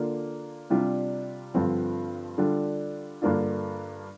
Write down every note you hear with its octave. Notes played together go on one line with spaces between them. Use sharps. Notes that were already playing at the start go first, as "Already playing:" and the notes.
Already playing: D3 A#3 D4 F4
C3 G3 D4 F4
G2 D3 F3 C4 F4
D3 G3 D4 F4
G2 D3 A#3 D4 F4